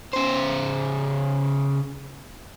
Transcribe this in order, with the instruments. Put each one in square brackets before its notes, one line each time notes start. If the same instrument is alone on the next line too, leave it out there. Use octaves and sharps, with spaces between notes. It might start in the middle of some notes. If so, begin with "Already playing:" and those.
[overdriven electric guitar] C#3 C5